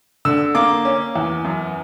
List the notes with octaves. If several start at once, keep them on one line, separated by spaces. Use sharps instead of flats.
D3 E6
A#3 D6
C#4
E2
F#2